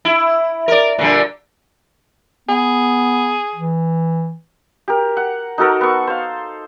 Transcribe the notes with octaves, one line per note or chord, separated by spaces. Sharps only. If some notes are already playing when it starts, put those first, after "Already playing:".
E4
A#4 D5
A#2 D3 G3
B3 G#4
E3
G4 A#4
F#5
D#4 F#4 A4 A#4
B3 C#6
C5 F5